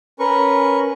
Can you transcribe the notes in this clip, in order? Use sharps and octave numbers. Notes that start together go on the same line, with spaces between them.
C#4 A#4 B4 C#6